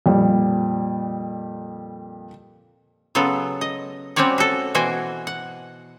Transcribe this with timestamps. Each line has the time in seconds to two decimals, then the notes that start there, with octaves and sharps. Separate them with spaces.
0.06 F2 A#2 G3
3.15 C#3 F#3 B3 F4 A4
3.61 D#5
4.16 G3 C4 C#4 F#4 C#5 D5
4.38 F#4 A4
4.75 B2 E3 F#4 C5 G5 G#5
5.27 F#5